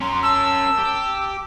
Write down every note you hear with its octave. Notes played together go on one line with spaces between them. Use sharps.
C#4 A#4 C6
A5 E6
G4